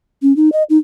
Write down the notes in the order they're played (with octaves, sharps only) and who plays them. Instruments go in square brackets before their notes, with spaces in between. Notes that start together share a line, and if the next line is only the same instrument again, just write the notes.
[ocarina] C#4
D#4
D#5
D#4